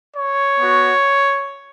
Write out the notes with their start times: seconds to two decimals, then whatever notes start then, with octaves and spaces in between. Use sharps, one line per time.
0.16 C#5
0.60 B3 F#4